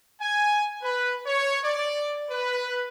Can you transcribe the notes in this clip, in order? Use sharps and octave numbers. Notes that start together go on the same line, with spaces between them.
G#5
B4
C#5
D5
B4